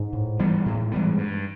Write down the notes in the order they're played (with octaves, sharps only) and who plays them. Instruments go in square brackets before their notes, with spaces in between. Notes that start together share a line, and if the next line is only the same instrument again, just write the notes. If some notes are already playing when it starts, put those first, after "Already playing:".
Already playing: [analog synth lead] G#2
[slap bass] A2
E3 G3 B3
A2
E3 G3 B3
G2